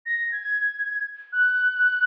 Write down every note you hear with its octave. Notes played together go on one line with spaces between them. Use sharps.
A#6
G#6
F#6